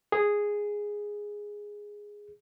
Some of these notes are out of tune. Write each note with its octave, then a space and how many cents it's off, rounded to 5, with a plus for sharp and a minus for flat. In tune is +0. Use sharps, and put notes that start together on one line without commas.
G#4 -5